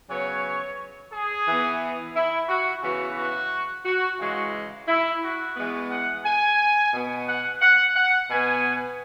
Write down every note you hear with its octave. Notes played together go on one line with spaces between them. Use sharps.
C#3 F#3 B3 C#5
G#4
E3 B3
E4
F#4
C#3 E3 B3 F#4
F#4
F#4
C#3 E3 G#3 F#4
E4
F#4
E3 G#3 B3
F#5
G#5
B2 B3
F#5
F#5
F#5
B2 B3 G#5